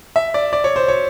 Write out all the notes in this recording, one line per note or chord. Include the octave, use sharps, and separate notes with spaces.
E5
D5
D5
C#5
C5
C#5